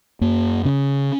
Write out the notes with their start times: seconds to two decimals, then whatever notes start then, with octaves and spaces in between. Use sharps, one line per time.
0.21 F#2 A#3
0.65 C#3 C#4